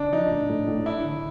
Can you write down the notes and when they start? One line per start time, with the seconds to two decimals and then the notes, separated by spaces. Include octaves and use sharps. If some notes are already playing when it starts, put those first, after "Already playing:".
Already playing: C#2 C#3 D4
0.13 F3 D#4
0.31 A2
0.49 A2
0.68 A2
0.86 D4 E4
1.05 D3